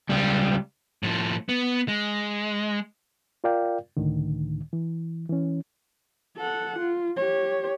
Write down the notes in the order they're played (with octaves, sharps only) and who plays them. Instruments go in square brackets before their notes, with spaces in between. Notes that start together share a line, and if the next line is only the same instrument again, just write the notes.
[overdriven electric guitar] C#2 G3
[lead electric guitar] A2 F3
B3
G#3
[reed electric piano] F4 A#4 D5 F5 G5
C#2 A2 D3 D#3
E3
E3 C#4
[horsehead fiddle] A4 F#5
F4
G4 C#5